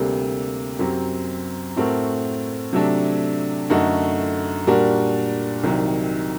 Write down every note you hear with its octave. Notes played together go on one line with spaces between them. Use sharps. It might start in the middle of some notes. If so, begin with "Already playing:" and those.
Already playing: D2 C3 G3 A#3
F#2 F#3 C4 G4
A2 A3 C4 F#4 A#4
C3 F#3 A3 D4
F#2 D3 A3 D#4 F#4
A#2 G3 D4 F#4 A#4
C2 C3 D#3 F#3